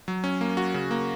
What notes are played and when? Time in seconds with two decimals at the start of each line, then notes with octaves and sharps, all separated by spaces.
0.08 F#3
0.24 C#4
0.41 A#3
0.57 F#4
0.74 C#3
0.91 A#3